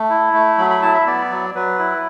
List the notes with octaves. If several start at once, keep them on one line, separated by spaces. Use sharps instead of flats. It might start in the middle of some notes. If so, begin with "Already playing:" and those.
Already playing: A3
E4
A3
F#3 B5
B5
E4 A5
E5
B3 D5
F#3
F#3 B4
E4